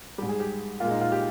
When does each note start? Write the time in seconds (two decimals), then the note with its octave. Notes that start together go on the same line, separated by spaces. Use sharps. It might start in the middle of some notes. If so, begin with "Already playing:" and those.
0.18 G#2 G3 G4
0.29 G#4
0.40 G4
0.80 A#2 G#3 F4
0.91 D#4
1.01 F4
1.12 G4